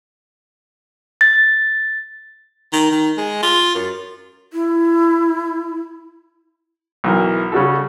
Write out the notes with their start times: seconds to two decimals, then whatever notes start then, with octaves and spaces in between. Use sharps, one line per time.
1.21 A6
2.73 D#3
2.91 D#3
3.17 G#3
3.43 F4
3.75 F#2
4.53 E4
7.04 B1 E3 A#4
7.52 C#3 G3 F#4 A4